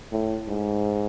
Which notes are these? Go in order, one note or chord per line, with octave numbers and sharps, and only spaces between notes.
A2
G#2